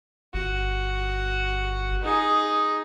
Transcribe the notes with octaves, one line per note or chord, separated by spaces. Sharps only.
G1 F#4
D#4 G#4